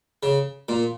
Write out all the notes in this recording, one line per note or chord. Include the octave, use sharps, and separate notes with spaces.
C#3
A#2